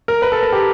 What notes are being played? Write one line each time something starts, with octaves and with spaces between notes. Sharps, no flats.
A#4
B4
A4
A#4
G4